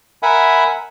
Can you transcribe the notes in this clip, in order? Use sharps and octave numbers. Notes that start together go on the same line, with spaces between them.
A#4 E5 F#5 G#5 B5